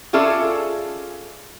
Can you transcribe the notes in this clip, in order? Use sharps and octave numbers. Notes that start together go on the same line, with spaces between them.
C#4 F4 G#4 A4 D5 E5